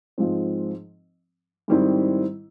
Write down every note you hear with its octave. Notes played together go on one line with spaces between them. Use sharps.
G#2 F3 G#3 C4
G#2 D#3 G3 C4 E4